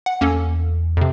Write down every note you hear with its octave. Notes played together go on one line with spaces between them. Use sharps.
F#5
E2 A#3 C#4 A4
F2 C3